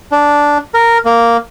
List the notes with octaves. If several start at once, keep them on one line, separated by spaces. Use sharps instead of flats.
D4
A#4
A#3